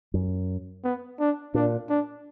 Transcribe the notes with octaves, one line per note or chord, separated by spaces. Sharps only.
F#2
B3
D4
A#2 D4
D4